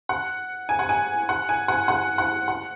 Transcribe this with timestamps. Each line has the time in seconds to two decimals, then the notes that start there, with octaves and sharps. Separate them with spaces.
0.09 F#5
0.69 G#5
0.79 F#5
0.89 G#5
1.29 F#5
1.49 G#5
1.68 F#5
1.88 F#5
2.18 F#5
2.48 F#5